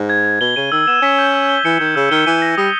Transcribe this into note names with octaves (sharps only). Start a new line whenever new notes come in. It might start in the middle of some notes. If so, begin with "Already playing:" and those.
Already playing: G#2
G#6
G#6
B2 G7
C#3 D#7
D#3 E6
B3 E7
C#4 B6
G6
E6
G7
E3 C#7
D#3 G6
C#3 E6
D#3 G7
E3 D#7
A#6
G3 D#6